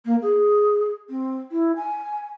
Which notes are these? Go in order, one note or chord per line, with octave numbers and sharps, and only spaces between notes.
A#3
G#4
C4
E4
G#5